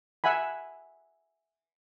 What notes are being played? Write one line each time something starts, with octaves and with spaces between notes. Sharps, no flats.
E5 F#5 G#5 B5